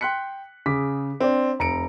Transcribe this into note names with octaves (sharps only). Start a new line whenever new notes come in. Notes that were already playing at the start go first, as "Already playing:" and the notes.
G5 C6 F#6 B6 C#7
C#3 G#4 D6 B6
C4 D4
F1 A#5 C#7 D7